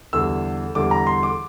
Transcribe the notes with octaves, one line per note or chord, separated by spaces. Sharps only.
E2 D3 G3 E6
E2 D3 G3 D6
A#5
C6
D6